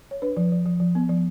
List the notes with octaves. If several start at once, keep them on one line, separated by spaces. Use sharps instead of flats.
C#5
D4 B4
F3
F3
F3
F3
B3
F3